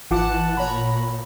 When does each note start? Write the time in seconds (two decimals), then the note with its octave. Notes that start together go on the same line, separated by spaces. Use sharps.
0.11 G#1 E3 F4 F#5 A5 D6 F#6
0.57 A#2 C#5 A#5 B5